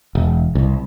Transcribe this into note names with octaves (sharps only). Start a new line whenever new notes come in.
E1
C2